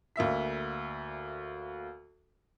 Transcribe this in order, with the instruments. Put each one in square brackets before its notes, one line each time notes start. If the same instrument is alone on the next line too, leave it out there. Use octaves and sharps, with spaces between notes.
[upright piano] D2 A#3 E5 B6